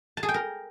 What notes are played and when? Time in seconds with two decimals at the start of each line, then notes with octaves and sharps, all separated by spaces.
0.17 A5
0.23 G#4
0.29 G5
0.34 A#4